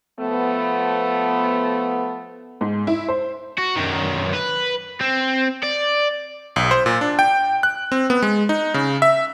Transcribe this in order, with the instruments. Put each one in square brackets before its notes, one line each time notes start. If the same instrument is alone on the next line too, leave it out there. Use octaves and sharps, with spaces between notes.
[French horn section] F3 A3 B3
[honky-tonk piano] G#2
E4
C5
[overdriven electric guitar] F#4
F#2 D#3
B4
C4
D5
[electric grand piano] B1
C5
A#2
D4
G5
F#6
C4
B3
G#3
D#4
C#3
E5